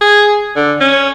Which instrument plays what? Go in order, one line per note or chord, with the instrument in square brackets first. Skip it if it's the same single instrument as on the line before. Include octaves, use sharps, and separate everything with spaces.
[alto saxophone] G#4
D3
C#4